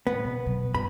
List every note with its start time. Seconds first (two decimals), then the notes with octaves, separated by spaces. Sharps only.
0.07 A2 G#3 B3
0.25 B2
0.46 B2 F#3
0.75 G2 B5